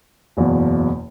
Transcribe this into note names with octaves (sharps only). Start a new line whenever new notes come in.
F#1 E2 B2